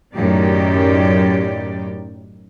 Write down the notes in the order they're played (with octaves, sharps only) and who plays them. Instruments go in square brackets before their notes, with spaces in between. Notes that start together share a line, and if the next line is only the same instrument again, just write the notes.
[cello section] F#2 A2 D#3 G4 D5